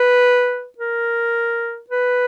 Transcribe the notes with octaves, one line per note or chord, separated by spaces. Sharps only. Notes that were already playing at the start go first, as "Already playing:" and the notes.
Already playing: B4
A#4
B4